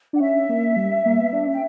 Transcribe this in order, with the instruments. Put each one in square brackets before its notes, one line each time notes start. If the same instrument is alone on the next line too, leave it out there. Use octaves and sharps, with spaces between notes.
[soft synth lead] D4
[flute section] F#5
[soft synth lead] C#4 [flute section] E5
[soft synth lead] A#3
G3
A#3
B3
D4
[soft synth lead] C#4 [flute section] G5